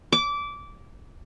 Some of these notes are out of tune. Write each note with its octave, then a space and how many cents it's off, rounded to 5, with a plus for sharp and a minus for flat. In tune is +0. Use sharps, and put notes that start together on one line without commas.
D6 -20